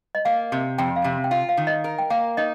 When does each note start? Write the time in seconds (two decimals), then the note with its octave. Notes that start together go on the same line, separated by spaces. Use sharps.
0.15 D#5
0.25 A#3 F5
0.52 C3
0.78 F2 G5
0.96 F5
1.04 C3
1.24 G5
1.31 F4 F5
1.49 F5
1.57 D#3
1.67 D#5
1.84 A#4
1.99 G5
2.10 A#3 F5
2.37 D#4 D#5